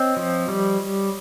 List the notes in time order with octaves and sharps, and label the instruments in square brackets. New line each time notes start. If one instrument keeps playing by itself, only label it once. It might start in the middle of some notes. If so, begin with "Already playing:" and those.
Already playing: [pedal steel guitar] C4 [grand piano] C#5 D#5
[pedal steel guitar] F3
G3